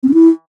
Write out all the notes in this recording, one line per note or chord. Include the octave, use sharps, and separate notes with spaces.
C4
C#4
E4